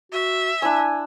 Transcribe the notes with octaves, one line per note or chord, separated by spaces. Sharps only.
F#4 E5
D4 E4 G#5 E6